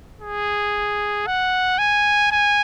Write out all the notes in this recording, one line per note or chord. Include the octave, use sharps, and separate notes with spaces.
G#4
F#5
G#5
G#5